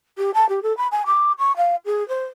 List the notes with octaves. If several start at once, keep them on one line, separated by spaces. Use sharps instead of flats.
G4
A5
G4
A4
B5
G#5
D6
C#6
F5
G#4
C5